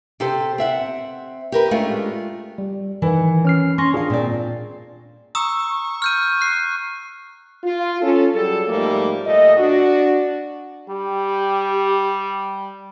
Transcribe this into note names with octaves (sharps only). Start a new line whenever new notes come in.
C3 G4 A4 C5
C4 E5 F#5
G4 A#4 B4
G#3 A3 C#4 D4 F4 G4
G3
D#3 E3 F#5
C#4 F6 C7
C#4 C6 C#6 A#6
D#3 D4 F4 G#4 F5
A#2 C4 D5
A#5 C#6 D#6 E6
F6 G6 D#7
F#6 C7
F4
C#4 A4
F#3 G3 G#4 A4
G#2 F3 G3 A3 A#3
A#2 A3 D#5
D4 F#4
G3 G4